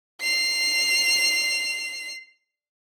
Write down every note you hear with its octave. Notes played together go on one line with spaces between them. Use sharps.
C7 F7